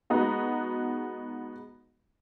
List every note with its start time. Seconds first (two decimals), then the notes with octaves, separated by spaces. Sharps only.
0.10 G#3 B3 D#4 F#4